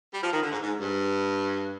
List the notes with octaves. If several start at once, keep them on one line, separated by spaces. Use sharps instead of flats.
G3
F3
D#3
D3
G#2
G#2
G2